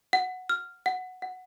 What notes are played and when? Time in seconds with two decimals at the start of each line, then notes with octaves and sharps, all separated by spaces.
0.13 F#5
0.49 F6
0.86 F#5
1.22 F#5